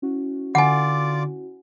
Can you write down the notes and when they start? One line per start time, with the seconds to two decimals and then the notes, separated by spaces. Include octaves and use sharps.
0.02 C#4 E4 F#4
0.55 D3 F4 D5 F#5 G#5 D6